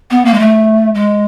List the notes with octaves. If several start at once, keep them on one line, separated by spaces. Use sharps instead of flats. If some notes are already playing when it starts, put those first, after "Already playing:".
B3
A#3
G#3
A3
G#3